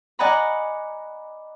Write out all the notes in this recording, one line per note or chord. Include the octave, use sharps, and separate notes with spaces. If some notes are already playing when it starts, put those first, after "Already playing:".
D5 D#5 F#5 G#5 A#5 B5